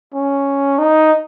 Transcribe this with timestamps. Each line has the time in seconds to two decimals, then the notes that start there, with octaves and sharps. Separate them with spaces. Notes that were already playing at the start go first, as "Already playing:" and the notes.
0.14 C#4
0.78 D#4